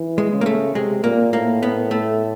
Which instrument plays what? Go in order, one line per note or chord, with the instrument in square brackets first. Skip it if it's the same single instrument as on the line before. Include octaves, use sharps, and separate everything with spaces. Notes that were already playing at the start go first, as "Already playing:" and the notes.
Already playing: [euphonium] E3
[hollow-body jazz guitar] G#3
[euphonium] C#3
[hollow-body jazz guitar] A#3
A3
[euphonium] C3 [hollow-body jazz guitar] G#3
[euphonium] A#2 [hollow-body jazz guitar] A#3
[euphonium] A2 [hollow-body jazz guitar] A#3
[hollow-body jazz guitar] B3
A3